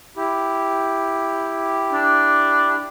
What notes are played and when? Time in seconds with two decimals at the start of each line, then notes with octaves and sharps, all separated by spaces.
0.17 E4 G4
1.93 D4